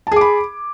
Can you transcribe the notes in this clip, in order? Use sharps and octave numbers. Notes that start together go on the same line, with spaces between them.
G#4 A5 B5 D6